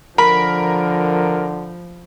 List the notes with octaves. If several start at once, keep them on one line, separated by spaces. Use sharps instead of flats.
D3 F3 A#4 B5